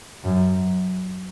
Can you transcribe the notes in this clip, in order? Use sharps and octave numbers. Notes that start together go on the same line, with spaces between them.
F#2